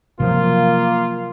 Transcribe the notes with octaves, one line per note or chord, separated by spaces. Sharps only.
C3 F3 F#3 A#3 F4